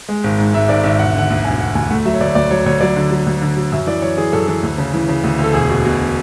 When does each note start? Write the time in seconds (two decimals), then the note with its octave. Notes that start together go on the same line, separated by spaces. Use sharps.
0.09 G#3
0.24 G#1
0.39 G#2
0.54 G#2 E5
0.69 G#1 D5
0.84 G#1 E5
0.99 E1 F#5
1.09 E5
1.15 D3 F#5
1.30 D2
1.44 E1 G#5
1.60 E1 F#5
1.75 D2 G#5
1.90 A3 F#5
2.05 F#3 E5
2.13 C#5
2.21 D2 D5
2.35 D2 D5
2.51 F#3 C#5
2.66 D2 C#5
2.81 F#3 D5
2.96 D3
3.11 F#3
3.26 D2
3.42 D3
3.57 F#3
3.72 F#2 E5
3.87 E3 D5
4.02 E3 C#5
4.18 E3 G#4
4.33 F#2 A4
4.48 E3 A4
4.63 D2
4.78 C#3
4.94 E3
5.09 C#3
5.24 D2
5.39 D2 A4
5.53 E1 G#4
5.70 B2
5.85 B2